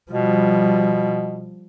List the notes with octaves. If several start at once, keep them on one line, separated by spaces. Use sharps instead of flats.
B2 F3 G3